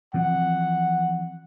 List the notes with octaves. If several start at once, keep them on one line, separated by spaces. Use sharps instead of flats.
E3 F3 C4 F#5